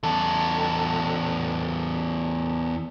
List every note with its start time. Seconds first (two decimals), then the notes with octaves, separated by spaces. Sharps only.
0.03 E2 A4